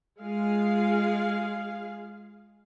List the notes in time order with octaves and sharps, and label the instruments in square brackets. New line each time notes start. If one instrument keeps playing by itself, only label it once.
[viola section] G#3 F4 G#4 F5